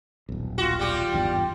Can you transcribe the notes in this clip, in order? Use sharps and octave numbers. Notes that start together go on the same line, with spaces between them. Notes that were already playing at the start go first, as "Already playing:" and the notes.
D#1 B1
F4 F#4
G3 G4
G#1 E2 G2